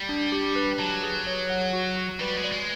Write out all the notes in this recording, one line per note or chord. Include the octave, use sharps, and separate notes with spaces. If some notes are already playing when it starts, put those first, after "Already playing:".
Already playing: G3
D4
G4
B4
F#3 A5
G#4
C#5
F#5
F#4
F#4
G3 B4
G#3
D5
G#3